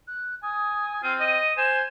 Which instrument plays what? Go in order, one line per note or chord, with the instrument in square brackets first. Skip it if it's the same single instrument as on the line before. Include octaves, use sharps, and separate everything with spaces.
[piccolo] F#6
[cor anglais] G#5 [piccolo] D#6
[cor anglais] C4 [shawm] F4 [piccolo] D#7
[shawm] D#5 [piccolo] D#7
[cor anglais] C5 [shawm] G#5 [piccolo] E7